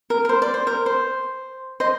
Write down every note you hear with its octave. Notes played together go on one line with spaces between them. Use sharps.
A#4
A#4
C5
D5
C5
A#4
C5
C5 D#5